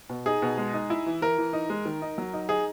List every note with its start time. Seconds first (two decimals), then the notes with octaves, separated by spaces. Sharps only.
0.10 B2
0.26 D#4 G#4
0.42 B2
0.58 G#3
0.74 D#4
0.90 E4
1.06 E3
1.22 E3 A#4
1.38 E3
1.53 D#4
1.70 G#3
1.85 D#3
2.02 D#4
2.18 F#3
2.33 D#4
2.49 D#4 G#4